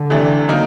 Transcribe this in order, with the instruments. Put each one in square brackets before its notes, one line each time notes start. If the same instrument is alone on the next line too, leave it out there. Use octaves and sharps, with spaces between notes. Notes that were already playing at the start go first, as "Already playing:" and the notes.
Already playing: [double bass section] D3
[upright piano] C3 E3 A3 D4
F#3 A#3 D#4